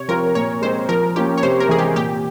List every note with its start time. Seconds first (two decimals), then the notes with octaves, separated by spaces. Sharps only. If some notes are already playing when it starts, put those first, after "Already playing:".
Already playing: C3 C#5
0.08 F3 C4 F4 A#4
0.35 A#2 C#5
0.62 G#3 C4 C5
0.89 F3 A#4
1.15 A#3 C#4 F4 G4
1.37 C#5
1.43 C3 C5
1.60 A#4
1.69 E3 G#4
1.74 G#3 G4
1.96 A#2 G4